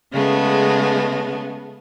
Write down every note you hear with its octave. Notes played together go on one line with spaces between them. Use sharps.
C#3 G#3 A3 B3